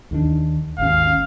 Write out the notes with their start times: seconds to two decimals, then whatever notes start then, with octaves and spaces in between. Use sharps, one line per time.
0.11 D#2 D#3 D4
0.78 G#1 D#2 C#4 F5